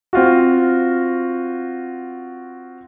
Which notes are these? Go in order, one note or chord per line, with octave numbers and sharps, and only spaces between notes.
C4 F4 F#4